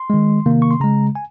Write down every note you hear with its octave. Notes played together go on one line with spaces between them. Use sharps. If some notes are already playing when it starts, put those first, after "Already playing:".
Already playing: C6
D#3 G#3
C3 D#3 A#3
C#6
C6
C#3 G#3 A#5
G#5